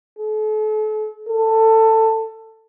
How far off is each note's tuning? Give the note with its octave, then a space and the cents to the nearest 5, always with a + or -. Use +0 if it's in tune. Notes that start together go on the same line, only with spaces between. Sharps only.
A4 -40
A4 +15